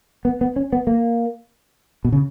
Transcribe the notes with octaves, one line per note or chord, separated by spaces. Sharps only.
B3
B3
C#4
B3
A#3
B2
C#3